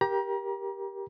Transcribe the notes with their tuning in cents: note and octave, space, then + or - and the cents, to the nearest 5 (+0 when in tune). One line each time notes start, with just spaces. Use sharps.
G4 +0 A#4 +20 A#5 +35